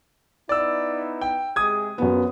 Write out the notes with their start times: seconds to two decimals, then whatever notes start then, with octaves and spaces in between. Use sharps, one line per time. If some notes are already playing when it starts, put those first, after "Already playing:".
0.49 B3 D#4 E4 D5 E6
1.21 G5
1.56 C3 G#3 G#4 D#6 G#6
1.98 A#1 F#2 B3